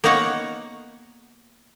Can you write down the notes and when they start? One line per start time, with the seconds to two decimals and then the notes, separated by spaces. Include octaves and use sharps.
0.04 A#3 B3 D#4 C#5 F#5